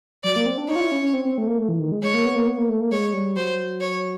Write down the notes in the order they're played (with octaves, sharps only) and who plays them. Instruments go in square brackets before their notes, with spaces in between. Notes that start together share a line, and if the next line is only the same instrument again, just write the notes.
[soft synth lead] F#3 [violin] D5
[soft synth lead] A#3
C4
D4
[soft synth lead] D#4 [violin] C#5
[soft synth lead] F4
E4
C#4
C#4
C4
C4
A3
A#3
A3
E3
D#3
G#3
[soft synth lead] G#3 [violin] C#5
[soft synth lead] A#3
B3
A#3
B3
A#3
A3
A#3
[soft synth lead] G#3 [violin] C#5
[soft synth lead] G3
[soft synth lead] F#3 [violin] C5
[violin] C#5